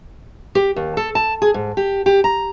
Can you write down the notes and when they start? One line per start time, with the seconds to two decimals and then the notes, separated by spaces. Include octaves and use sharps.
0.55 G4
0.76 D#2
0.97 A4
1.15 A5
1.42 G#4
1.54 G#2
1.77 G4
2.06 G4
2.24 A#5